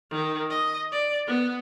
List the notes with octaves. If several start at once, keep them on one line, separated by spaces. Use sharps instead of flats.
D#3
D#5
D5
B3